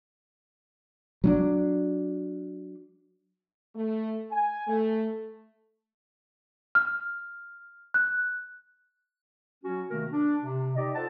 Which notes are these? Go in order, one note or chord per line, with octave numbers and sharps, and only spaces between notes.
F#3 C#4 D4
A3
G#5
A3
F6
F#6
F#3 C#4 F#4
C3 D#3 A3 A#3 F#4 A#4
D4
C3
D#4 G4 D5 D#5
F4 A4 C5 F#5 A5